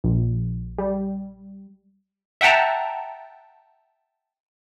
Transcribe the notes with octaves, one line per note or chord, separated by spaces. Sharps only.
A#1
G3
E5 F#5 G5 A5 A#5